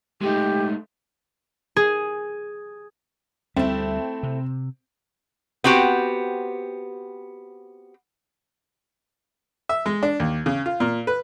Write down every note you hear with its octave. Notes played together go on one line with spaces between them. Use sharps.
G#3 A3 D#4 G4
G#4
D2 G3 A3 C4 E4
C3
B3 C4 F#4 G4
E5
G#3
D4
D#2
C#3
F4
A#2
B4